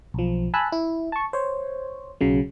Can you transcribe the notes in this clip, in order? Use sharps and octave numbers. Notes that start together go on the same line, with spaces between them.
B1 F3
G#5 A5 B5 E6 F#6
E4
A5 C#6
C5 C#5
B1 C#3 F#3